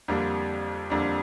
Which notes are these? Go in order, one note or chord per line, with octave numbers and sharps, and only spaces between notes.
F2 D3 G3 A#3 D4
F2 D3 G3 A#3 D4